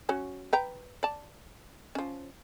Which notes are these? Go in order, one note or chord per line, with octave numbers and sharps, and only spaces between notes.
F#3 C#4 F#4
B4 G5 A#5
D5 A5
F3 C#4